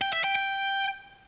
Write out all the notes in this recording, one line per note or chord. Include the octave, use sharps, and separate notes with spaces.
G5
E5
G5
G5